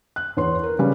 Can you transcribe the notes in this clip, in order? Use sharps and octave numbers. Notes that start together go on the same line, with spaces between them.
F#6
E2 C#5 C6
A#4
C#3 G3 C#4 B4